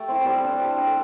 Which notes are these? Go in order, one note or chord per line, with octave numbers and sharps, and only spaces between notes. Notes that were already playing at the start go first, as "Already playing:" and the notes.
Already playing: A3 G4 A4 D5
C4 E4
G3 A4 C5
D4
G3 A5
D4
A4